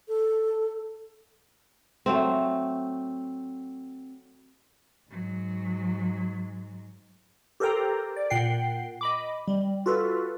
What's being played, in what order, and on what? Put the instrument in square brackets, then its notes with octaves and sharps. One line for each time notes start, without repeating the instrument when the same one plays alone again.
[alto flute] A4
[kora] F#3 A3 C4
[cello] G#2 F#3
[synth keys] G4 A4 A#4 C5 G5 A#5
D5
A#2 F#5 G5 C7
D#5 B5 D6
G3
F4 F#4 A4 B4